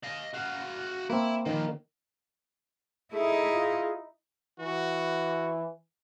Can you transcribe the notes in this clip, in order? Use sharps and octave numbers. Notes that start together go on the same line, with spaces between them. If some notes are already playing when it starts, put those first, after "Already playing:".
D#5 F5
F#4 F5
A#3 C4 E4
D#3 F3 A#3
A3 D#4 E4 G#4
F4
E3 F#4